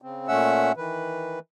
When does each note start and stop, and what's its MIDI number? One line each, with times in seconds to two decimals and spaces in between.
0.02 0.28 49
0.02 0.28 60
0.28 0.72 46
0.28 0.72 57
0.28 0.72 61
0.28 0.72 76
0.28 0.72 78
0.28 0.72 88
0.77 1.39 51
0.77 1.39 52
0.77 1.39 71